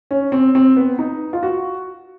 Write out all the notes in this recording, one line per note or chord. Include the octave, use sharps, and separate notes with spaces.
C#4
C4
C4
B3
D#4
F4
F#4